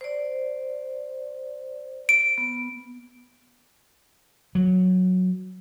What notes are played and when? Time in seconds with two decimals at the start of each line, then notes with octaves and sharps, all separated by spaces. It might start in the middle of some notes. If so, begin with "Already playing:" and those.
0.01 C5 D5
2.09 D7
2.38 B3
4.55 F#3